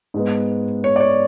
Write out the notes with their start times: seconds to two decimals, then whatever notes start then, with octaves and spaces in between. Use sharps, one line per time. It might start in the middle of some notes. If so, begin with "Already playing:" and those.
0.14 G#2 G#3 B3
0.84 C#5
0.96 D5
1.00 C#5